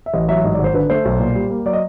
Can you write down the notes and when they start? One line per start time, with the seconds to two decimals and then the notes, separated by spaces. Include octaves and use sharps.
0.06 E5
0.13 A1 D#5
0.28 F#3 E5
0.44 G#2 D#5
0.54 D5
0.59 G#1
0.64 C5
0.74 D3 B4
0.90 A3 C5
1.05 B1
1.20 A#2
1.35 G3
1.51 A#3
1.65 F#3 D5
1.73 D#5